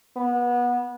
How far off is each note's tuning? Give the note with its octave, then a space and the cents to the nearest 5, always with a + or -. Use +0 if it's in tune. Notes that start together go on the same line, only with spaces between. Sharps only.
B3 -25